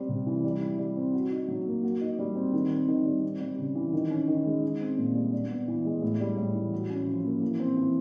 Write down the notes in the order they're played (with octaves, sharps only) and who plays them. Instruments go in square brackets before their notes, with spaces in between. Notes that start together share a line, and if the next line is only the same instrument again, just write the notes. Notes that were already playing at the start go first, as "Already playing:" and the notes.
Already playing: [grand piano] G3 C4
C3
E3
G3
E4
G3
C4
F#4
D#4
F#3
A#3
F#4
D#4
G3
C4
D#3
C4
D#3
G3
C4
G3
C#3
E3
D#3
C#4
D#3
G#3
D#4
C4
A#2
G3
D4
B3
E3
G#3
A2
G3
A2
E3
F#4
C#4
F3
A#3
E3
C4
E3